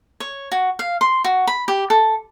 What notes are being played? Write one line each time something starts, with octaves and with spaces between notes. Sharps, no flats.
C#5
F#4
F5
C6
F#4
B5
G4
A4